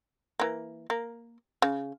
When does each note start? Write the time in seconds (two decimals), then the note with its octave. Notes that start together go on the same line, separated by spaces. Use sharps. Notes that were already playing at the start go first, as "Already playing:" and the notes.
0.40 E3 A#3
0.90 A#3
1.62 C#3